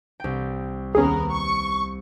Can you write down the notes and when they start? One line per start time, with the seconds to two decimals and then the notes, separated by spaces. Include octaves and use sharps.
0.20 C2 G5
0.95 D#2 B3 C#4 G#4 A#4
1.31 C#6